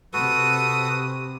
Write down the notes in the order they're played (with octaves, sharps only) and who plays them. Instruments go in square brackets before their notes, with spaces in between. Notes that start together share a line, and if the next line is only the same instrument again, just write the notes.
[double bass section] C3 [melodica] F#4 A4 B4 [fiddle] D#6